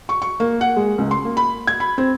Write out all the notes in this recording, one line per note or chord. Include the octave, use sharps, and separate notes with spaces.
C#6
C#6
A#3
F#5
G#3
C#2
C6
A#3
B5
G#6
B5
C4